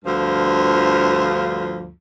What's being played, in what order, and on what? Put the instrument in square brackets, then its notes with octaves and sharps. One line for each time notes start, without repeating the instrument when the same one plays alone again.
[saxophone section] D2 G2 F3